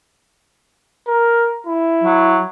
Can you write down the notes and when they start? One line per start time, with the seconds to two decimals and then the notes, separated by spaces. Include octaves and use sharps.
1.08 A#4
1.67 E4
2.03 F#3